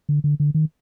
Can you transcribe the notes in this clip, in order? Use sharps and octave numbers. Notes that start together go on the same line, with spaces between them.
D3
D3
D3
D#3